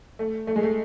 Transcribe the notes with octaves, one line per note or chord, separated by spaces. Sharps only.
A3
A3
G#3
A3